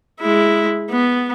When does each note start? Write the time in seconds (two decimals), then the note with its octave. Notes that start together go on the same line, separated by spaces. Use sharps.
0.20 G#3 E4
0.90 B3